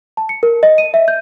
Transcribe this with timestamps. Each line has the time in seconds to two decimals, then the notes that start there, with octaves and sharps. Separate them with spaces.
0.17 A5
0.29 C#7
0.43 A#4
0.63 D#5
0.78 D#7
0.94 E5
1.08 G6